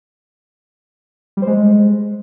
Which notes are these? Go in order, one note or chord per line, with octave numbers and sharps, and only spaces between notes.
G3
C5
G#3